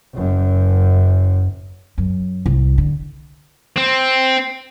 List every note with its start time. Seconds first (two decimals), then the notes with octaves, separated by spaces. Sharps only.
0.14 F#1 F#2
1.98 F#2
2.46 C2
2.78 D3
3.76 C4